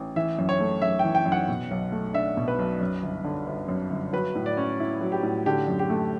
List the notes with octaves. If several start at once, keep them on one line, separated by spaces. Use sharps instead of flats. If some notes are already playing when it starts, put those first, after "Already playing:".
Already playing: A1
E3 E5
F#2
C#5
A3
F#2 E5
G5
E3
G5
F#2
F#5
B2
B1
A3
D4 E5
B2
B4
B1
F#2
G1
D3
G1
F#2
G1
F#3 B4
A2
D5
C#4
E4
F#3
G4
A2
D3 G4
F#2
G4
A3